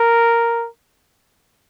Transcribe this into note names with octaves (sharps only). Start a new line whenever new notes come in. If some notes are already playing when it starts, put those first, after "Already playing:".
Already playing: A#4